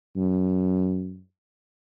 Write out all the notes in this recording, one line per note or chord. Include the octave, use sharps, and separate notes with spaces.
F#2